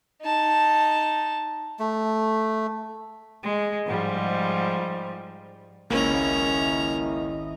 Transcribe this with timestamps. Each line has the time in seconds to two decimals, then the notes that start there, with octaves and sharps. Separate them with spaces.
0.21 D#4 A5
1.79 A3
3.43 G#3
3.86 G#2 F3 G3
5.90 G#1 C#2 A#3 C#4 E4 D#5 A#5